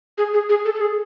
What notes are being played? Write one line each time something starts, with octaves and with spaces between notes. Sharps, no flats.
G#4
G#4
G#4
A4
A4
G#4